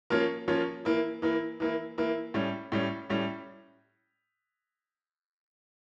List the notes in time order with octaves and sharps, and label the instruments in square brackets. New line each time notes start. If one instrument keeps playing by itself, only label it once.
[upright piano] F3 A#3 C#4 F4
F3 A#3 C#4 F4
E3 A#3 E4
E3 A#3 E4
E3 A#3 E4
E3 A#3 E4
A2 G3 C#4
A2 G3 C#4
A2 G3 C#4